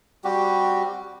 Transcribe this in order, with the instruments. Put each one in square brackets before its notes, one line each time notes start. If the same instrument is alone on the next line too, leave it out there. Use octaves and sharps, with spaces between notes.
[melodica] G3 C4 F#4 G4